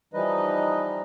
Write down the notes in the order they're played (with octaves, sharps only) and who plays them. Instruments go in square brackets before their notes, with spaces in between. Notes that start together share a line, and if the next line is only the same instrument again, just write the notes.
[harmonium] E3 F3 G3 D#4 B4 D#5